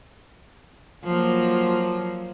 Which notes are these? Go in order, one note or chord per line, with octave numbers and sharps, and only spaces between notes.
F3 F#3 A#3